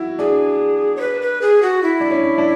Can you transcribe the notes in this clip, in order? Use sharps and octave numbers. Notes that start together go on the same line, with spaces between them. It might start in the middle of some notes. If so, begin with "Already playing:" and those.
Already playing: E4 F#4
D4 G#4
C#5
B4
B4
G#4
F#4
E4
D4
C#4
D4